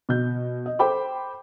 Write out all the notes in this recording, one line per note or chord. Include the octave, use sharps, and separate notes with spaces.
B2 G6
D#5
A4 C5 G5 B5 D6